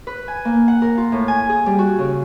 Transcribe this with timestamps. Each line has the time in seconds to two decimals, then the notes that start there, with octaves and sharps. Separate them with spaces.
0.07 B4
0.28 G#5
0.45 A#3
0.68 F#5
0.82 A#4
0.97 F4
1.12 A2
1.28 G#5
1.49 G#4
1.66 G3
1.79 F#4
1.99 C#3